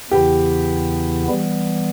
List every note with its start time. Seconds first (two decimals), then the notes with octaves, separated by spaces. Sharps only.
0.11 E2 C#3 E3 B3 E4 G4
1.28 E3 G3 B3